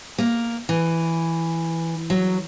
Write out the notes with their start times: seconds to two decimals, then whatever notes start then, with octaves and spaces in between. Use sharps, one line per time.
0.18 A#3
0.69 E3
2.10 F#3